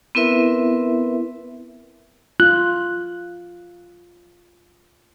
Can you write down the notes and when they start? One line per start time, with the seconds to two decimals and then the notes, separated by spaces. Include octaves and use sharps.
0.15 B3 C4 E4 A#4 B4 E5
2.40 F4 F#6